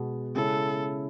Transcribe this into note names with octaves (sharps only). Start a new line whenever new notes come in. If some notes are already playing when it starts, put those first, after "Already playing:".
Already playing: B2 G#3 B3
C#3 G#3 C#4 E4 A4